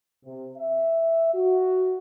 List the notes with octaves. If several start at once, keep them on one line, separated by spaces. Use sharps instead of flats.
C3
E5
F#4